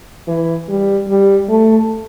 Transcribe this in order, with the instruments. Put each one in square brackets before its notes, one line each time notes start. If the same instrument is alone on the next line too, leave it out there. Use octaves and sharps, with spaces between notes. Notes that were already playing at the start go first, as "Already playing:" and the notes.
[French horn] E3
G3
G3
A3